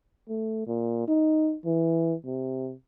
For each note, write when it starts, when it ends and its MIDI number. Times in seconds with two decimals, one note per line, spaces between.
0.29 0.66 57
0.67 1.07 46
1.08 1.56 63
1.66 2.14 52
2.26 2.73 48